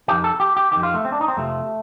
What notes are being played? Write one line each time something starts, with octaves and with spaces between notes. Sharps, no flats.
F2 D#3 G4
A4
G4
G4
F2 D#3 G4
F4
A3
C4
D4
D#4
C4
F2 C3 F3 A3